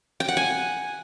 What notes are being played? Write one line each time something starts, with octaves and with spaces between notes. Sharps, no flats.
G5
F#5
G#5